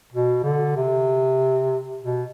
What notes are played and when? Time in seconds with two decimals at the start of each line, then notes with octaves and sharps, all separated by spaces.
0.12 B2
0.44 D3
0.76 C3
2.02 B2